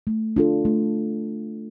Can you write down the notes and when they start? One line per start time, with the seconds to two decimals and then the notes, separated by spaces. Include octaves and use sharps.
0.07 A3
0.36 D4 F4 A4
0.65 A3